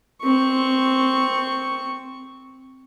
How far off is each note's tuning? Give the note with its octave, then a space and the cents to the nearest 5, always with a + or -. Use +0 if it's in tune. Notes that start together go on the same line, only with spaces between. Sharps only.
C4 +0 C#6 +0